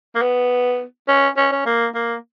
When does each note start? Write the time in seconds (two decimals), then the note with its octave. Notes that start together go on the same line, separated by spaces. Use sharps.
0.15 A#3
0.22 B3
1.08 C#4
1.37 C#4
1.52 C#4
1.66 A#3
1.95 A#3